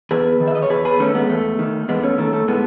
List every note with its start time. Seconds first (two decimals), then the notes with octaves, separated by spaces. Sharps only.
0.11 E2 G#4 B4
0.40 D#3
0.48 E5
0.55 D#5
0.62 C#5
0.70 E2 G#4 B4
0.85 G#4 B4
1.00 D#3 A3 C#4
1.15 G#3 B3
1.29 E2 A3
1.59 D#3
1.88 E2 G#3 B3
2.03 A3 C#4
2.18 D#3 A3
2.33 A3
2.48 A2 G#3 B3